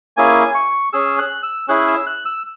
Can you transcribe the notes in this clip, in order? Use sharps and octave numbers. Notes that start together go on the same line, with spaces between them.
A#3 C#4 E4 G#4 G#5
C#6
C#4 G#4 E6
F#6
E6
C#4 E4 G#4 F#6
E6
F#6
E6